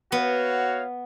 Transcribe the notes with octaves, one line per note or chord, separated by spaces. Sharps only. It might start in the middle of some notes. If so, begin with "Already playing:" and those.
B3 F#4 C#5 F5